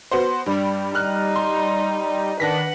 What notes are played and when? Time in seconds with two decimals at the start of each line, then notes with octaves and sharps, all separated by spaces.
0.11 B3 F#4 C5
0.46 G2 G3
0.95 D#4 F6 F#6
1.36 C6
2.40 D#3 D4 B4 F#5 A#6 B6